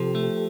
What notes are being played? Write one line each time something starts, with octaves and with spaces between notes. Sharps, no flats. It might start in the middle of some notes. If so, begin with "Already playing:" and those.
Already playing: C3 F3 G4 A4
A3